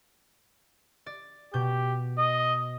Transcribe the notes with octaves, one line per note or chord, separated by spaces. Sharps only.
D5
B2 G4 G6
D#5